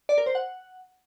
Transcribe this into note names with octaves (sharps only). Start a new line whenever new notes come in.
D5
A#4
C5
F#5